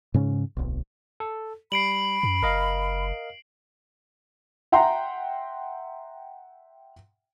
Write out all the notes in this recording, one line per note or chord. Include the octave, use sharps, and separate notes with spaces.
G#2 C#3 C#4
D1 B1
A4
G3 B5 C7 D7 F#7
F#2
F#1 A#4 D#5 F5
E5 F#5 G5 A#5 C6